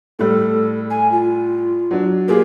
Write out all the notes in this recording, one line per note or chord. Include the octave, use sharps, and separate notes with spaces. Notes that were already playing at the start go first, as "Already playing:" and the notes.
A2 G3 A4
G#5
F4
F#3 D4
A#3 F4 G4 G#4